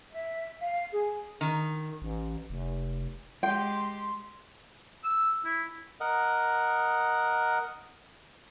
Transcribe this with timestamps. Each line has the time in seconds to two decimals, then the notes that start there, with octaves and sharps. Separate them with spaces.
0.11 E5
0.61 F5
0.92 G#4
1.41 D#3
2.02 A1
2.50 F1
3.43 G#3 G4 G5 C6
5.04 E6
5.45 E4
6.01 A#4 D#5 F#5